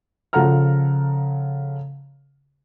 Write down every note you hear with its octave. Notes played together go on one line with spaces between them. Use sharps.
C#3 F3 A4 F#5 A#5 F6